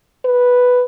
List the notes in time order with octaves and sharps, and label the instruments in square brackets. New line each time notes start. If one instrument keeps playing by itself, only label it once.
[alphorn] B4